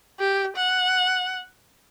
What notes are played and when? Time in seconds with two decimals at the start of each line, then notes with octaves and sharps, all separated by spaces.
0.20 G4
0.57 F#5